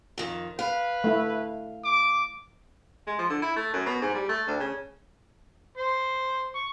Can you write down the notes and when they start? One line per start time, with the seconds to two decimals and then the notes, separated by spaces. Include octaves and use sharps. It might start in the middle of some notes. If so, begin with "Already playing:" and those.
0.18 F2 D#3
0.59 B4 F5
1.04 A3 E4
1.85 D6
3.07 G#3
3.18 F3
3.30 D3
3.42 E4
3.56 A3
3.73 F#2
3.86 B2
4.01 G#2
4.14 G3
4.29 A3
4.47 D2
4.60 C#3
5.77 C5
6.55 C#6